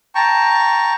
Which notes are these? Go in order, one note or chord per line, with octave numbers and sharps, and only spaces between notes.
G5 A5 A#5 C#6